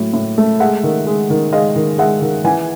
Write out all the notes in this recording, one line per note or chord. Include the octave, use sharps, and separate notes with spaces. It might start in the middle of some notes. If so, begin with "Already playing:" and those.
Already playing: A2 F#3
A2
A3
G#3 E5 F#5
D#3
G#3
D#3
G#3 D#5 F5
D#3
G#3 E5 F#5
D#3
E3 F#5 G#5